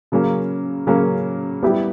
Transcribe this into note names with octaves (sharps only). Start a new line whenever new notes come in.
C#3 F#3 A#3 C#4
C#3 F#3 A#3 C#4
G3 B3 E4 G4